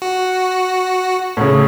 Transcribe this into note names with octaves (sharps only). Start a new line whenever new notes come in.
F#4
A2 C#3